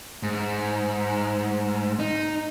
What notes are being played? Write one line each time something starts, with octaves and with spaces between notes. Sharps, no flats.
G#2
D#4